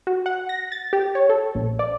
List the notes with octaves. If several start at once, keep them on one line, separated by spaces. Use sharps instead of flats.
F#4
F#5
A#6
A6
G4
C#5
A4
A#1
D5